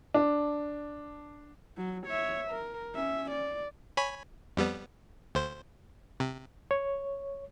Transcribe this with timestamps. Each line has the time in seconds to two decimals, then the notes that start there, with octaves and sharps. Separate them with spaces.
0.14 D4
1.77 F#3
2.06 C#5 E5
2.51 A#4
2.94 C#4 E5
3.31 D5
3.97 C#5 G#5 B5
4.57 F2 G3 B3
5.35 D2 C5
6.20 C3
6.71 C#5